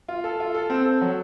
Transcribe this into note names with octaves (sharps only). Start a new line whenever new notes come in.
F4
A4
F4
A4
C4
A4
F#3